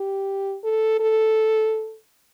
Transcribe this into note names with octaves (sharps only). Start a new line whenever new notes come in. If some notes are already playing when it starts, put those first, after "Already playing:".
Already playing: G4
A4
A4